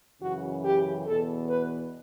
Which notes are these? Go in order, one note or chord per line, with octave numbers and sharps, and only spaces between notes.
F#2 C#3 E3 F#4
G4
E2 B2 A4
B4